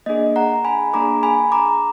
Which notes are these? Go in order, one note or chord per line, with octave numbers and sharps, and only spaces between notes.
A#3 D4 G#4 D#5
F#5 A#5
G#5 B5
A#3 D4 G#4 A#5 D6
G#5 B5
A#5 D6